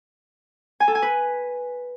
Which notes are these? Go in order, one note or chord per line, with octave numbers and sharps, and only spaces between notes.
G#5
A4
G#5
B4